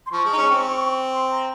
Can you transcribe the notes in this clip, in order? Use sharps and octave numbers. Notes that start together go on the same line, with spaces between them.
C6
F3 C#6
G#3
D#4
C#4
C4
C6
A#5